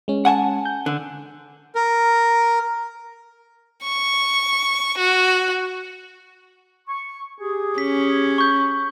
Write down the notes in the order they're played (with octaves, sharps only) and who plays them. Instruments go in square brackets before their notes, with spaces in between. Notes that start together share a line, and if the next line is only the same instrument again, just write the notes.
[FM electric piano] G#3 C#4
[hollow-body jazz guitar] F#5 G#5 A5
[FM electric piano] G6
[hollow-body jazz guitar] D3 [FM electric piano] F#6
[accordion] A#4
[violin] C#6
F#4
[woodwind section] C#6
G4 G#4
[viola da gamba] C#4 [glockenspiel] B6
[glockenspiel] C#6 G6